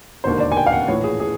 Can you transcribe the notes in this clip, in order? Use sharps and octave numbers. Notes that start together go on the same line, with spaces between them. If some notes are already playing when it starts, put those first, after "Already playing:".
E1 D#2 D3 C5
D5
G#5
G5
F5
F#5
A#1 A2 E3 C#5
G#4
G#4